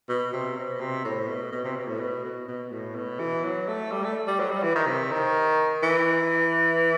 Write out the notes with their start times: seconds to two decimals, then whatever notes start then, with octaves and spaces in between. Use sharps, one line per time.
0.09 B2
0.33 C3
0.57 B2
0.80 C3
1.05 A2
1.28 B2
1.52 B2
1.64 C3
1.77 B2
1.88 A2
2.00 B2
2.24 B2
2.48 B2
2.72 A2
2.96 B2
3.20 E3
3.44 F#3
3.68 A3
3.91 G3
4.04 A3
4.28 G3
4.40 F#3
4.51 G3
4.63 E3
4.75 D#3
4.87 C3
5.12 D#3
5.83 E3